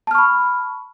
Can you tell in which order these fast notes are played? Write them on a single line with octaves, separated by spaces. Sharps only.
A5 F6 C#6 B5